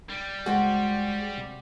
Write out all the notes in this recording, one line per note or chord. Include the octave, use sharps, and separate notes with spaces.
G3
C#2 G#3 F#4 G#4 C5 G5
C3